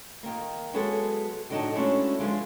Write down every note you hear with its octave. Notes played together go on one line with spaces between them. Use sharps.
D#3 A#3
F#3 G#3 B3 E4 G#4 A4
A2 D3 F#3 D#4 D#5 A5
G#3 A3 C#4 D4 E4 F#4
D3 F3 G#3 A4 B4